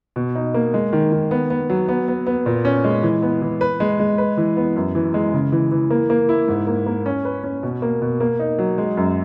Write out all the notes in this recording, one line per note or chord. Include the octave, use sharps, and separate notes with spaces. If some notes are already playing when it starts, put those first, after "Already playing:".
B2
D#4
A#3
G#3
D#3
D#3
B3
B3
F#3
B3
B3
B3
A#2
C#4
G#3
E3
B3
E3
B4
G#3
G#3
B4
E3
B3
F#2
E3
G#3
C#3
E3
E3
A#3
A#3
E4
G#2
A#3
A#3
C#4
B4
C#4
B2
A#3
B2
A#3
D#4
F#3
G#3
F#2